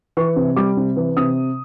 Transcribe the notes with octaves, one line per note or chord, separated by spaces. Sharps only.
E3 C#6
C3
G3 D6
C3
E3
C3 D#6